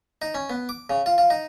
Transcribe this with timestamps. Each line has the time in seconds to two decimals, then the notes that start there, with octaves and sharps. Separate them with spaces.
0.22 D#4
0.34 C#4
0.50 B3
0.69 D6
0.90 C#3
1.06 F4
1.18 F4
1.30 D#4